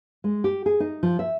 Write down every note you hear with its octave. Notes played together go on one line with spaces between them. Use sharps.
G#3
G4
G#4
D#4
F3
E5